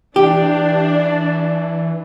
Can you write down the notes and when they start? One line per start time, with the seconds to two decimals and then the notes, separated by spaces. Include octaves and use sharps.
0.16 E3 D4 G4